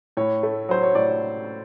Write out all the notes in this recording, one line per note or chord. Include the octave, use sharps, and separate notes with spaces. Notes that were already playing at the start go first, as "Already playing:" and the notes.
A2 C#5
A3
F#3 C5
C#5
A2 D5